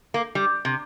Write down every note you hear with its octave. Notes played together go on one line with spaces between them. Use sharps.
A#3
G3
C3